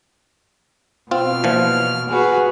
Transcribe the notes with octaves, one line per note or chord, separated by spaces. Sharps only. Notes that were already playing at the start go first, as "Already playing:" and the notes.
B2 C4 F4 F6
A#2 E3 F3
F#4 G#4 B4